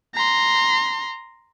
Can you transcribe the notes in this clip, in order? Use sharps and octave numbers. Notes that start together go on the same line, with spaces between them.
A#5 C6